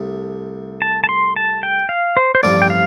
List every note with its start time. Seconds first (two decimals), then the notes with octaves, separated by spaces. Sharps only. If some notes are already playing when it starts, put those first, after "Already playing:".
Already playing: C2 C3 A3
0.82 A5
1.04 A5
1.09 C6
1.36 A5
1.63 G5
1.89 F5
2.17 C5
2.35 C5
2.43 A1 G2 F3 C4 F4 D5
2.62 G5
2.70 F5